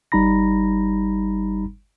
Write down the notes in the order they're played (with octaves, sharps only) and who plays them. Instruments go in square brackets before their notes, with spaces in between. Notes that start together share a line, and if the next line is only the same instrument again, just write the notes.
[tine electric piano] G1 G3 D#4 A#5 B5 A#6